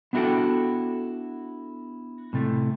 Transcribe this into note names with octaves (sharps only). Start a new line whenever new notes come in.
B3 D4 E4 F#4 A4 G5
A2 C3 A3